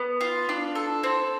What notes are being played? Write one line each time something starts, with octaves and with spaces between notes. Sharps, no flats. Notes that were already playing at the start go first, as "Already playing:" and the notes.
Already playing: B3
F4
D4
A4
C4